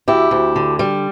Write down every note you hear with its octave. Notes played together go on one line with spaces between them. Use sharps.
D2 E4 G4
D2
D3
G3